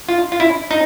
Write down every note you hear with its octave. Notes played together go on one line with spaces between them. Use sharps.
F4
F4
E4
D#4